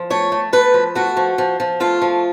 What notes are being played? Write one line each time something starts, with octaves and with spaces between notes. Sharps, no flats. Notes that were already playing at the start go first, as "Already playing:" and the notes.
Already playing: F3
A3 C#5
A3
A3 B4
F3
A3 F#4
F3
F3
F3
A3 F4
F3